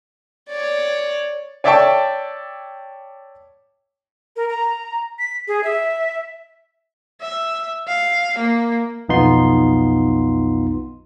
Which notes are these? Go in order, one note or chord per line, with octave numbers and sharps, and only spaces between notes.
C#5 D5
C#5 D5 E5 G5 A5 C#6
A#4
A#5
B6
G#4
E5
E5
F5
A#3
B1 F2 B3 D#4 F4 C6